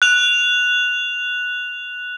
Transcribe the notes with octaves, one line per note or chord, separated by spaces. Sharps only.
F#6 F7